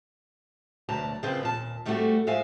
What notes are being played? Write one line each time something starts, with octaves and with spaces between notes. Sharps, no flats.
D2 B2 F#3 D5 A5 A#5
C#3 F3 A#3 C4 F4 B4
D#2 A#2 A5
A2 G3 A3 C4 F4 F#4
A2 F3 G#3 E5 F5 G#5